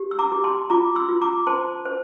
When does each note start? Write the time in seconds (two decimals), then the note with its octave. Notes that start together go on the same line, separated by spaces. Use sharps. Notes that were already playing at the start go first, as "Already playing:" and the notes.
Already playing: G4
0.11 E6
0.19 A#5 D6
0.32 G4
0.44 A5 C6
0.70 F4 A#5 D6
0.95 C6 E6
1.09 F4
1.21 A#5 D6
1.47 C5 A5 C6
1.85 C5